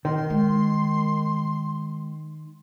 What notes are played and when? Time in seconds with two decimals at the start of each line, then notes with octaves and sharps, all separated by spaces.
0.05 D#3 C6
0.30 G#3